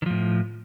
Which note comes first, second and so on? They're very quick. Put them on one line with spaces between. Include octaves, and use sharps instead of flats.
D#3 F3 A2